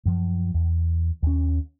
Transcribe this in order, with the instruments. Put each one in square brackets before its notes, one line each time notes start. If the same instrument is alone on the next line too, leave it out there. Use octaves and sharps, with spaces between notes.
[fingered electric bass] F#2 F3
E2
D#2 C#4